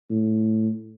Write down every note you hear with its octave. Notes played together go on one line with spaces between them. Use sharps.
A2